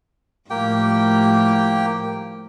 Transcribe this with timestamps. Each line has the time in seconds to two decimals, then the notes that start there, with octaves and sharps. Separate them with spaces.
0.50 A2 F3 G3 A#3 G4 G5